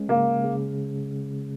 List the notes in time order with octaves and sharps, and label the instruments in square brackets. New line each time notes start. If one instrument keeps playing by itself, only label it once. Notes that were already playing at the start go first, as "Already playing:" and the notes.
Already playing: [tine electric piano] G#3 C#4
[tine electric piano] C#3 [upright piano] A#3
[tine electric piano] C#3